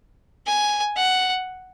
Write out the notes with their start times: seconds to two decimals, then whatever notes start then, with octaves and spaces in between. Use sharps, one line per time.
0.47 G#5
0.96 F#5